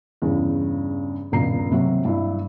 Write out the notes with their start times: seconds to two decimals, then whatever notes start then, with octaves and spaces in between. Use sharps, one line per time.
0.22 E2 G2 C#3
1.32 D#1 C#2 G2 B2 A#5 C7
1.72 C3 F#3
2.05 G2 E4